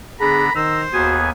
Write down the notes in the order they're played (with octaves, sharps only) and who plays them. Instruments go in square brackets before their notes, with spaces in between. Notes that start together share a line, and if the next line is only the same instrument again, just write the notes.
[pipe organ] D3 B3 D4 [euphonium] G#4 [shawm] A#5 [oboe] B5
[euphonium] D#3 [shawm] C5 [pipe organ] A#5 [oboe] E6
[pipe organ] D#2 B3 G#5 [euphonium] F#4 [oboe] G#4